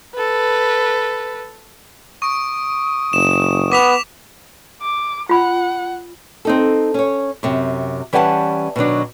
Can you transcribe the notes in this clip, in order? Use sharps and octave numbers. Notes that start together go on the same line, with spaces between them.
A4 B4
C#6 D#6 D7
F#1 E7
B3 D6 B6 F7
D6
F4 F#5 B5
C4 D#4 A4
C#4 C#5
F#2 C3
E3 G3 C#4 F#5 G#5 A5
B2 D#3 F#3 D4